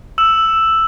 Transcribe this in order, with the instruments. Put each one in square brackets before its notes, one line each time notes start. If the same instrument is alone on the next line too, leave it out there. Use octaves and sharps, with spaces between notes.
[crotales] E6 E7